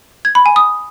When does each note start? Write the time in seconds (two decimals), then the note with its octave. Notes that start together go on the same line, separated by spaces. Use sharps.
0.25 G#6
0.35 B5
0.46 G#5
0.56 D#6